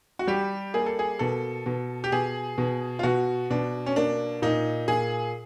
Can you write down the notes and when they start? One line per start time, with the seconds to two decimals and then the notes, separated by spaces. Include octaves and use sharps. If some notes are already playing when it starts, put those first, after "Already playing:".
0.19 F#4
0.27 G3 G4
0.74 A#3 G#4
0.86 A4
0.99 G#4
1.19 B2 A4
1.66 B2
2.04 G4
2.12 B2 G#4
2.58 B2
2.99 F4
3.03 B2 F#4
3.50 B2 D4
3.86 C#4
3.96 A#3 D4
4.42 A#2 D#4
4.88 A#2 G#4